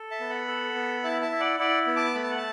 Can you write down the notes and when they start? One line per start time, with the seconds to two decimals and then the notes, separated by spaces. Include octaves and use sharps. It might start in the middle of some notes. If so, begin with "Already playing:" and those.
Already playing: A4
0.11 E5 A5
0.20 B3
0.30 F#5 B5
0.48 A4
0.76 B3
1.04 E4 E5 A5
1.22 E5 A5
1.32 E4
1.40 D5 F#5
1.59 E4 D5 F#5
1.87 B3
1.96 A5 D6
2.15 A3 B5
2.23 A5
2.31 F#5
2.37 A5